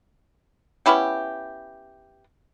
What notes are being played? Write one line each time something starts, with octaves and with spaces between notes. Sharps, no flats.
B3 C#4 E4 G4